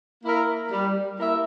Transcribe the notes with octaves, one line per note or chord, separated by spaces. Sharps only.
A#3 E4 A#4 E5
G3
A#3 E4 A#4 E5